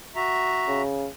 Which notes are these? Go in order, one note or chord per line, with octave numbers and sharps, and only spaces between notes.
F#4 E5 A#5
C#3